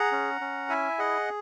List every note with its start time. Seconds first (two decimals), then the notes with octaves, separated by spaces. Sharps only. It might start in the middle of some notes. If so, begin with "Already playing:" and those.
Already playing: G#4 F#5 A#5
0.12 C#4
0.41 C#4
0.69 E4 E5 G#5
0.99 G#4 D#5 F#5